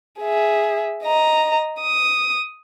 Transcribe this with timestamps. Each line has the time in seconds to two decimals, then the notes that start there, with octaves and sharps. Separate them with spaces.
0.20 G#4 E5
1.03 D#5 A#5
1.81 D#6